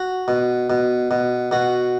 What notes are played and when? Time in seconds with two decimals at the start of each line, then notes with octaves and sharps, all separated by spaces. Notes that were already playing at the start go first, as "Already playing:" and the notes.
Already playing: F#4
0.28 B2
0.70 B2
1.11 B2
1.51 B2 F#4